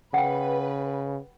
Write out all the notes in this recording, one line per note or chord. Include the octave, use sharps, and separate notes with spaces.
C#3 B4 F#5 G5